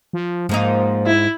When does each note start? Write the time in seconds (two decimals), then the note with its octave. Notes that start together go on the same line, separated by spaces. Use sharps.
0.13 F3
0.49 G#2 F3 A#3 D#4
1.06 E4